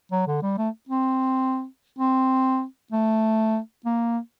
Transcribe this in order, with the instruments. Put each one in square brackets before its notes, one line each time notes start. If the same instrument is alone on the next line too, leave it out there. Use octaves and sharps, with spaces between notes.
[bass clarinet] F#3
D3
G3
A3
C4
C4
A3
A#3